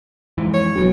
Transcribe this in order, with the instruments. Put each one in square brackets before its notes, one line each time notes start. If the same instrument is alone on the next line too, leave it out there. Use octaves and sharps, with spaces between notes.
[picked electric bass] F2 G#2 E3
[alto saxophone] C#5
[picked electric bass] E1 B2 [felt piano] F#3